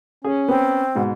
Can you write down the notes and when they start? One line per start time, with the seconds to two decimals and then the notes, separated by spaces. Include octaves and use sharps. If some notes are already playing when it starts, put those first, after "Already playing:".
0.24 C#4 G#4
0.48 B3 C4
0.95 G#2 B2